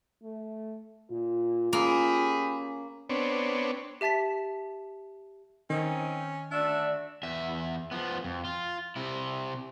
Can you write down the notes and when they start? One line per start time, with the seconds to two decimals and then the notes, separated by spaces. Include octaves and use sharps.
0.23 A3
1.11 A#2 F4
1.73 A#3 C#4 G4 G#4 B5
3.09 B3 C4 D4 C#5
4.01 G4 E5 A5 A6 B6
5.70 D#3 C4 C#4 D#4
6.51 D2 D4 F#4 D5 E5
7.23 E2 E5
7.91 F3 B3
8.24 F2
8.45 F4
8.96 C3 E4